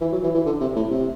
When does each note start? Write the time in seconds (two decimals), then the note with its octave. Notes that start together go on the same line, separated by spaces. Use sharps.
0.01 E3
0.13 F#3
0.23 E3
0.35 E3
0.46 D3
0.61 C3
0.76 A2
0.90 C3